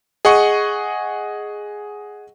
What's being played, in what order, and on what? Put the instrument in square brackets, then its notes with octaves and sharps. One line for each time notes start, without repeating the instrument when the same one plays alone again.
[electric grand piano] G#4 D#5 F#5 C#6